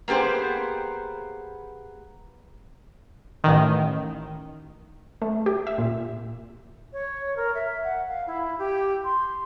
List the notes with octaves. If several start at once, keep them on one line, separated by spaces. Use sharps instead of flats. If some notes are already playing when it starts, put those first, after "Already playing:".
A#3 B3 G4 G#4 C5
A1 D#3
A3
G4
E5
A#2
C#5
A#4
E5
F#5
F5
E4
G4
C6